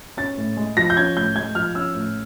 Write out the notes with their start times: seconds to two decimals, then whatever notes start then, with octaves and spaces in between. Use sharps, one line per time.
0.17 C#4 A6
0.37 A2
0.57 G#3
0.77 F3 A#6
0.90 G6
0.96 C#4 G#6
1.16 A2 G6
1.36 G#3 G#6
1.55 F3 F6
1.75 C#4 E6
1.95 A2